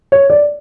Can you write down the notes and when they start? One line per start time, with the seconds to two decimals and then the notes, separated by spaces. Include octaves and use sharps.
0.12 C#5
0.30 D5